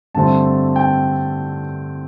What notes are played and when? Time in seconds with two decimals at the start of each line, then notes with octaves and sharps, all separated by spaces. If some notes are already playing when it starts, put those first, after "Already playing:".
0.14 G2 D3 A3 C4 A5
0.76 G5